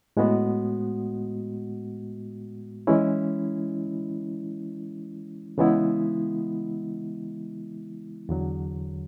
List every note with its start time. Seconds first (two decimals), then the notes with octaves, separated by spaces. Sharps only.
0.17 A2 G#3 B3 F#4
2.87 E3 G#3 C#4 E4
5.58 C#3 E3 G#3 B3 E4
8.29 E2 D3 F#3